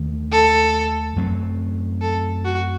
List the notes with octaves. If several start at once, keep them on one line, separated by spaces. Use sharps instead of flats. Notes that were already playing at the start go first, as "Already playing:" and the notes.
Already playing: D#2 D#3 A3
A4
F#2 F#3 A3 C4
A4
F#4